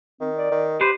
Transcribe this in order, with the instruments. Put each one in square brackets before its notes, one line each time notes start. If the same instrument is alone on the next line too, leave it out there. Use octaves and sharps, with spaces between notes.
[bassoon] D#3 [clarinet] C4
[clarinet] D5
[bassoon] D#3
[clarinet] G4 [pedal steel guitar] B4 C5